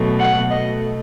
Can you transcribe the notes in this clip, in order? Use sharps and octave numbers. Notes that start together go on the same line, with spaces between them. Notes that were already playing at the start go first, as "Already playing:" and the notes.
Already playing: B2 F#3 A3
F#5
B2 A3 D#5